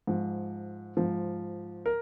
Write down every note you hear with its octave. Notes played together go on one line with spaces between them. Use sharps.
G#2 F3
G#2 F3
A#4